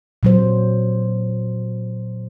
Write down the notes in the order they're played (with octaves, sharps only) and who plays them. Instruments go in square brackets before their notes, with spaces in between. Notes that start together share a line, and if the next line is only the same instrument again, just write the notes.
[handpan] A#2 F#3 C5